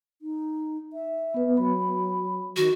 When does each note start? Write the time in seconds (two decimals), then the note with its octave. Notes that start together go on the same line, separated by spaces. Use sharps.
0.22 D#4
0.93 E5
1.34 B3 B4
1.57 F#3 B5
2.57 D#3 F#4